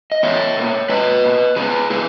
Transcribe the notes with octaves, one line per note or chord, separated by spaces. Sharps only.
D#5
G#2 E3 B3 C#5 E5
B2 A#3
G#2 E3 G#3 B4 D#5
B2 A#3
C#3 G#3 B3 G#4 B4
C#3 G#3 B3 E4 G#4